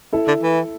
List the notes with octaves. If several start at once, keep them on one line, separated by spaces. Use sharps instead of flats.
E4 A4
D3
E3